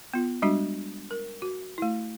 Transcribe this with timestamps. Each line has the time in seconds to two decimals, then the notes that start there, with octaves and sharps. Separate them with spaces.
0.14 B3 F4
0.42 G3 G#3 D4 F#4
1.11 A#4
1.42 F#4
1.78 A3 E4